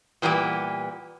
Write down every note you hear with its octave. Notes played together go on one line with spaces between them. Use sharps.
A#2 E3 G3 B3 G4